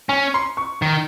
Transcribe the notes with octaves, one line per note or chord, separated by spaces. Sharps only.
C#4 G#5
C6
C#6
D#3